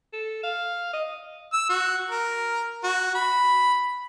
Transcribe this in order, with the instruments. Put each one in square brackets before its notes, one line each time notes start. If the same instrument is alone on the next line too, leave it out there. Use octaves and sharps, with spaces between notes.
[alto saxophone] A4
F5
D#5
[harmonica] E6
F#4
A#4
F#4
B5